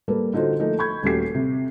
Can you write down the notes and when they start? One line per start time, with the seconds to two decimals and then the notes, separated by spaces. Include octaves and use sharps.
0.08 G3 A#3 A4 B4
0.34 D3 D#4 F4 F#4 C5
0.59 F3 A3 A#3 D#4 F4
0.79 B5 C#6 G6 G#6
1.03 D#1 A3 C#4 F#4 G4 C7
1.35 C3